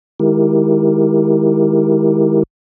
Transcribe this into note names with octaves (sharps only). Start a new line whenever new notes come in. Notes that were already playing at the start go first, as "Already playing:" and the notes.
D#3 G#3 E4 G4 A#4